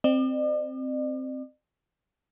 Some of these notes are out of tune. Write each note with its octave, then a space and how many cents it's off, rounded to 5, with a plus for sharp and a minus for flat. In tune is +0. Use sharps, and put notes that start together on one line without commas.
C4 +0 D5 +45